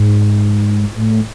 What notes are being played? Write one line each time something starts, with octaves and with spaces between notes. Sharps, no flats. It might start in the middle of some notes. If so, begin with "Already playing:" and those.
Already playing: G#2
A2